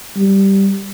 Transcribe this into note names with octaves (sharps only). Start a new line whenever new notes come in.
G3